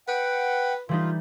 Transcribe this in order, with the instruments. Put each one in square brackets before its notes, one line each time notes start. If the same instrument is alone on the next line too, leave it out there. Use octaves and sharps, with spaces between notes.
[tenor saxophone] B4 [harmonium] F#5 G5
[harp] E3 G3 D#4 [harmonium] F4